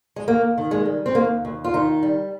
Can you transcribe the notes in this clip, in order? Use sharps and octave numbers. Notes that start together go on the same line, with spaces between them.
G#3
D#2 A#3
D#3
G#3
G3
C4
D#2 A#3
D#2
F4
D#3 D#4
G3